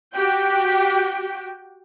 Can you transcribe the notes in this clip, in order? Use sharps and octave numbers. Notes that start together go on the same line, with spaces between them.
F#4 G4 G5